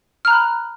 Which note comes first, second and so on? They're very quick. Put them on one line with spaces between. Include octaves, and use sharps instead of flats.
F6 A#5 F#6 B5